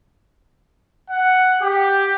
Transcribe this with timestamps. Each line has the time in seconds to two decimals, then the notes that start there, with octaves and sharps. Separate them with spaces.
1.10 F#5
1.63 G4